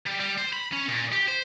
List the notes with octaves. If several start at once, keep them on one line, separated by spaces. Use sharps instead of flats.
G3
G3
C5
B5
C#4
A#2
G4
C5